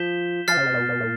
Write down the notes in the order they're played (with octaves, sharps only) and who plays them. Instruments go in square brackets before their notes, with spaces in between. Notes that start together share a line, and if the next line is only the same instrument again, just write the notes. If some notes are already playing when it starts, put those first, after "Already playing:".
Already playing: [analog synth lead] F3 [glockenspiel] G6 B6 E7 G7
[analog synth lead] F3 [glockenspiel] F6 A6 C7
[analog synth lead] C#3
C3
B2
B2
A#2